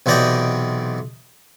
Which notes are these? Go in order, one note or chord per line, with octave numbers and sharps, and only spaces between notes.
B1 C3 E3 D5 D#5 G5